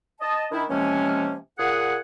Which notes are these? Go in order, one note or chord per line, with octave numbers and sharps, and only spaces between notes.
D#5 A5
D#3 D4 E4
C3 E3 F3 G#3 A#3 C#4
A#2 G#4 F#5